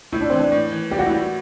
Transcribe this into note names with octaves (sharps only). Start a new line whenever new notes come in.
A2 E4
D4
E3 C4
D4
A2
E3
G3 G4
F#4
E4
G3 F#4